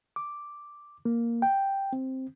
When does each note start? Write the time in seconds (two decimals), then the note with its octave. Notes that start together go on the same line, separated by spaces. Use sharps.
0.16 D6
1.05 A#3
1.42 G5
1.93 C4